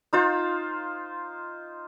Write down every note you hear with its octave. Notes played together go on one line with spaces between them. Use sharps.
D#4 F4 C5